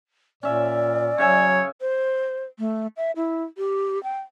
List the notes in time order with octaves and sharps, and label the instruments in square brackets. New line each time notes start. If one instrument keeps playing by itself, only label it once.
[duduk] A#2 [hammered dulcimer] C#4 E5 [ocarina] D5
[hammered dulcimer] C#3 E5 G#5 [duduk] F#3 [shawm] C#5
[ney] C5
A3
E5
E4
G4
G5